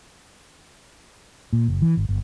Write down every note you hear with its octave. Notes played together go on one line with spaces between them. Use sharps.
A#2
F#1
E3
G#1
G1